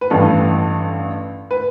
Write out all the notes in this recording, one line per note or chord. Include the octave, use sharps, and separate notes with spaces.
B4
A1 G2 E3 A4
B4